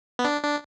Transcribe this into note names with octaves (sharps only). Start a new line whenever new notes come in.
B3
D4
D4